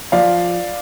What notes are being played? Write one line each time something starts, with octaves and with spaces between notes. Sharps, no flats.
F3 D5 F5